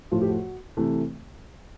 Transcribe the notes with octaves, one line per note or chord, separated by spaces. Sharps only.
A2 F3 A3 F4
G4
F#4
C3 E3 A3